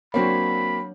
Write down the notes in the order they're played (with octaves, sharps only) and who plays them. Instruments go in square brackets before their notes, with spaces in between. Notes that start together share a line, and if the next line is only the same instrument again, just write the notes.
[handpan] F#3 D4 C#5 [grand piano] A#3 C4 F#4 [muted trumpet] B5